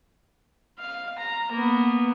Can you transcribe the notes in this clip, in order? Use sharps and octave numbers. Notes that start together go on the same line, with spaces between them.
F5
A#5
A#3 B3